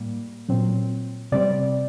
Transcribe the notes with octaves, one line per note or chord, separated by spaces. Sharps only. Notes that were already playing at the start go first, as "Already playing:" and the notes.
Already playing: A2 G3 A#3
A#2 F#3 C4
C3 G3 C4 D5